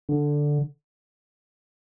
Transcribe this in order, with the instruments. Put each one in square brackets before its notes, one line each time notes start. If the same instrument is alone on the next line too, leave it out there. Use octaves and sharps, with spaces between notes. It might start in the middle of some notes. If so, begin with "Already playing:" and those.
[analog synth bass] D3